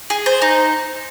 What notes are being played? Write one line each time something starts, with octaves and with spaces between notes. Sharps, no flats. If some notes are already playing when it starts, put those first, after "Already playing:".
G#4
C5
D#4